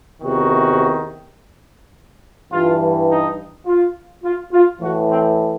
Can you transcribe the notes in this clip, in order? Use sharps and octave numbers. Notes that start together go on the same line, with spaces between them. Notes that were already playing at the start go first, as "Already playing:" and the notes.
E2 C3 D#3 F#4
G2 E3 F4
D#4
F4
F4
F4
A2 E3 F#4
C4